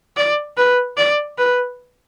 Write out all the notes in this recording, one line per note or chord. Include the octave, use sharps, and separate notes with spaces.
D5
B4
D5
B4